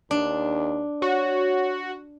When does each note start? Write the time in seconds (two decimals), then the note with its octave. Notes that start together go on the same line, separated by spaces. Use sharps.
0.11 D#2 D4
1.02 F#4 C#5